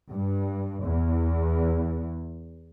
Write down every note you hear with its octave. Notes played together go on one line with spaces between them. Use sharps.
G2
E2